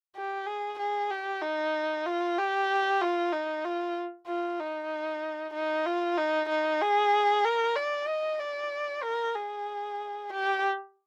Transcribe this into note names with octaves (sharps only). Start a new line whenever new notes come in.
G4
G#4
G#4
G4
D#4
F4
G4
F4
D#4
F4
F4
D#4
D#4
F4
D#4
D#4
G#4
A#4
D5
D#5
D5
A#4
G#4
G4